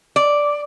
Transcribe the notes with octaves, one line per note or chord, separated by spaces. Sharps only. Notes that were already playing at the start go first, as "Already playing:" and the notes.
D5